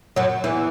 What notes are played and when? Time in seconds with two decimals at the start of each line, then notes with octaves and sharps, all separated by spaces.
0.16 F#2 F#3
0.44 E2 E3